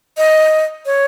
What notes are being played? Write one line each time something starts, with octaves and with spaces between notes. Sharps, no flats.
D#5
C#5